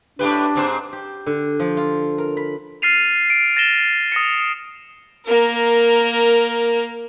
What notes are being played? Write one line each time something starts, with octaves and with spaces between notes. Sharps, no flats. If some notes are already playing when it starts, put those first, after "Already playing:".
A2 D4 G4 B4
G#2 C4 C5
G4
D3
F3
F4
A#4
B5
F6 A6 C7 D#7 F7
D7
A6 A#6 E7 G7
D#6 A#6 C#7
A#3 A#4